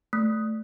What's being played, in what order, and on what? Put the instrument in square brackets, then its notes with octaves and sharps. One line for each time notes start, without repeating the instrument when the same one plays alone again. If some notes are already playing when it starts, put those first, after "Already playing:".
[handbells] A3